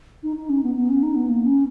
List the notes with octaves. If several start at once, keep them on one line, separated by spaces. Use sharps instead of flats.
D#4
D#4
C#4
B3
B3
C#4
D#4
B3
A#3
C#4